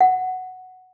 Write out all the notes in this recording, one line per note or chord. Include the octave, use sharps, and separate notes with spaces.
F#5